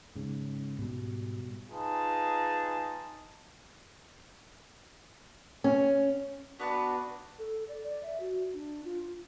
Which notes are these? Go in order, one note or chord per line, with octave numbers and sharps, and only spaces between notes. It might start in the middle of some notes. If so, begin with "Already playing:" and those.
G#2 C#3
G#2 B2 G3
D#4 F4 G#4 B4 A5
C#4
B3 D4 F#4 B4 A5
A4
D5
D5
E5
F#4
D4
F4